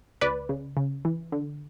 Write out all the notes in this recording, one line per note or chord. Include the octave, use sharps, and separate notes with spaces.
C#2 B4 D5
C#3
C#3
E3
D3